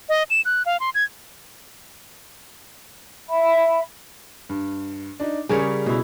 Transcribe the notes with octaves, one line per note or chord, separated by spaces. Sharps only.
D#5
E7
F#6
F5
C6
G#6
E5 B5
G2
D4 D#4
C#3 G3 C#4 G#4 A#4 C#5
B2 E4